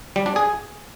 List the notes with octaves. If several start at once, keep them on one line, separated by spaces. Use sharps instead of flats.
G3
D4
G#4